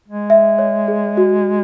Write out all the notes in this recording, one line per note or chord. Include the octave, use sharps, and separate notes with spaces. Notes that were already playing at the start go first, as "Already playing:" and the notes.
G#3
E5
C#5
G#4
F#4